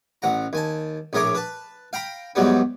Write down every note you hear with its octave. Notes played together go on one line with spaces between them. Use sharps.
A1 F#5 A#5
D#2 G#5 A5
A#1 A2 G#4 A#4 C#5 D6
B4 A5
F5 G5 A#5 B5
E2 G#2 F#3 G3 B3